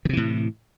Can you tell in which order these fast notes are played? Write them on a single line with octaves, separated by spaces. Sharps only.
D#3 C3 E3 A2